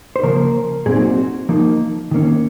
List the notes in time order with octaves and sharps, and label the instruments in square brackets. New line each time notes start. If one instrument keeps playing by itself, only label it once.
[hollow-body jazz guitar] C5
C#3 F3 A#3 A#4
A#2 F#3 C4 D#4 G#4
F#4
F3 A#3 D#4
D#3 A#3 C#4